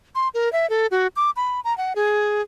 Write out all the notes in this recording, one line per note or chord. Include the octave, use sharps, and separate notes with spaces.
C6
A#4
E5
A4
F#4
D6
B5
A#5
F#5
G#4